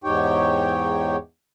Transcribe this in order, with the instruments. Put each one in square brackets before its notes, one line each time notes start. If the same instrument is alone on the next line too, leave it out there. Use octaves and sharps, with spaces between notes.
[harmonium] E2 G#2 D#4 G4 C#5 G5